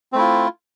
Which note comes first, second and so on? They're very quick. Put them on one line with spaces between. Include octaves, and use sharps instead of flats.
C4 A3 E4 F4